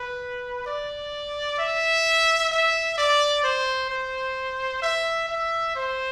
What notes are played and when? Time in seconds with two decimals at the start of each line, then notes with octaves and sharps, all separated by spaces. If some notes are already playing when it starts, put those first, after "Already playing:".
Already playing: B4
0.66 D5
1.58 E5
2.51 E5
2.98 D5
3.44 C5
3.90 C5
4.82 E5
5.29 E5
5.76 C5